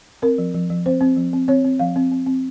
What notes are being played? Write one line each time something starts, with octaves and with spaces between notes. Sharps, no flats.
C4 A#4
F3
F3
F3
C4 C5
C4
F3
C4
C4 C#5
C4
F3 F5
C4
C4
C4